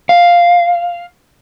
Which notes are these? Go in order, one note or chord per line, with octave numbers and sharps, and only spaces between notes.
F5